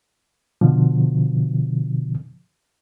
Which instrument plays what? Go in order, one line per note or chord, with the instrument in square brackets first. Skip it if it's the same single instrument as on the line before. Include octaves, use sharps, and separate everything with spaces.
[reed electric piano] B2 D3 F3